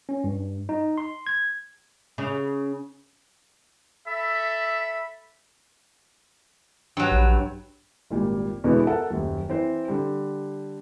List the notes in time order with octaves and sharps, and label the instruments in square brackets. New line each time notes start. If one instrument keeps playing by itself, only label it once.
[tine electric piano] C#4
G2
D#4
C6
G#6
[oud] C#3
[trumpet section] A4 E5 B5
[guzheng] G2 F#3
[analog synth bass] A#1
[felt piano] G#1 A#2 G3
E2 B2 D3 E3 G#3 B3
A4 A#4 F#5 A5
D#1 F#2
E3 C4 C5
D3 G3